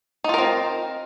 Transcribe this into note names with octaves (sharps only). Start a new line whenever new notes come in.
C4 D#4 F4 A#4